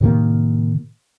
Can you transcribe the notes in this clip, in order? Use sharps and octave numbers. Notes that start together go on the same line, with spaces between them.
A2 C3 D#3 A#3